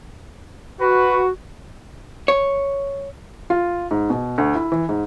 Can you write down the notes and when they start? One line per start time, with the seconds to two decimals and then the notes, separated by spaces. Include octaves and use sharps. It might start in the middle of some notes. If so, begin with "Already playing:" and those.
0.81 F#4 B4
2.28 C#5
3.50 F4
3.91 G#2
4.10 B2
4.38 D2
4.55 E4
4.72 E3
4.89 G#2